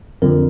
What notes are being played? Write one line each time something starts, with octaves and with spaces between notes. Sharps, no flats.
F2 D3 F3 A#4